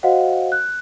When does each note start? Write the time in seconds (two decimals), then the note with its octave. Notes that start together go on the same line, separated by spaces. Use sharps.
0.03 F#4 C5 D#5 F5 F#5
0.52 F#6